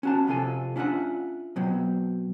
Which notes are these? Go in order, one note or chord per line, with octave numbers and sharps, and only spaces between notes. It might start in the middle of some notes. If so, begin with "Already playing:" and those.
C#4 F#4 A5
F2 C3 F4 A4 G#5
C#4 D4 F4 E5 F#5
B2 F#3 C4